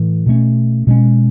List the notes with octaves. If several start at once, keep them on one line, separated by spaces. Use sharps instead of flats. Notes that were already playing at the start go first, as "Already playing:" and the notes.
Already playing: A2 E3
B2 A3 C#4
B2 G#3 C#4